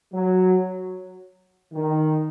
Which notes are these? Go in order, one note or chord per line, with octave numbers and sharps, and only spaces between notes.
F#3
D#3